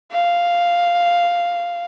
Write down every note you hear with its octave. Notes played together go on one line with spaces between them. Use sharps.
F5